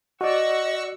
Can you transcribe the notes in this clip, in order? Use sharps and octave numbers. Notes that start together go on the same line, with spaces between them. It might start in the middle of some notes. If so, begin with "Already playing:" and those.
F#4 D5 D#5 F#5 C#6 E6